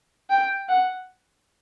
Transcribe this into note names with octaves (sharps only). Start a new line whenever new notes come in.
G5
F#5